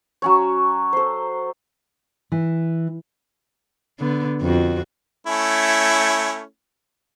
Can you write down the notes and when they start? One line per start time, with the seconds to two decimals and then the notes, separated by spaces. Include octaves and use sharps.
0.22 F#3 C#4 C#5
0.93 A4 C5
2.32 E3
4.00 D3 B3
4.42 F2 F#4
5.27 A3 C#4 E4